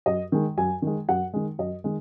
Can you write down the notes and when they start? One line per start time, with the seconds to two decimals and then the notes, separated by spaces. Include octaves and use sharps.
0.06 F#2 D#5
0.32 D#3 G#3
0.57 F#2 G#5
0.82 D#3 G#3
1.09 F#2 F#5
1.34 D#3 G#3
1.59 F#2 D#5
1.84 D#3 G#3